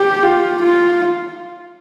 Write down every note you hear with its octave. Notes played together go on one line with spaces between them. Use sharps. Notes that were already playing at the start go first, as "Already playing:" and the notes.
Already playing: G4
F4
F4